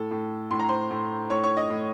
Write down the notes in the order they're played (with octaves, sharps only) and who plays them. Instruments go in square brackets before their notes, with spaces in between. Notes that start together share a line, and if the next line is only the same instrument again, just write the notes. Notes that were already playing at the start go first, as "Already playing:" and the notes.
Already playing: [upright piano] A2 A4
A2
A2 C6
A#5
C5 C6
A2
A2 C#5 C#6
C#5 C#6
D#5 D#6
A2